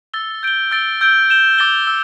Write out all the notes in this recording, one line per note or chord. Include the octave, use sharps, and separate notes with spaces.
E6 A6 G7
G6 D7 G7
E6 A6 D7 G7
E6 G6 D7 G7
G6 E7 G7
D6 A6 G7
E6